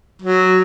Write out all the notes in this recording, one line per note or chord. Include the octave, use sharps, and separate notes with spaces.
F#3